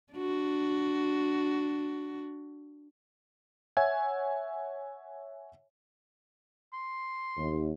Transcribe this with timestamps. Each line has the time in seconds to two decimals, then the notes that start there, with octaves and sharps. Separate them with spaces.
0.13 D4 F#4
3.77 C#5 E5 F#5 G#5 G#6
6.73 C6
7.36 D#2